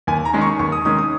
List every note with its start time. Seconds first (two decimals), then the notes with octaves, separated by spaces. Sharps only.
0.07 D#2 G#5
0.25 A#5
0.33 D#3 G#3 C#4
0.42 C#6
0.59 D#2 C#6
0.72 D#6
0.85 D#3 G#3 C#4 D#6
0.98 D#6